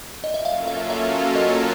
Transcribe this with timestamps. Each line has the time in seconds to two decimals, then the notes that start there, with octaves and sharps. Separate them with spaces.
0.24 D#5
0.34 E5
0.45 F#3 A#3 C#4 F4 A4 F5
0.67 E5
0.90 E5
1.35 D#5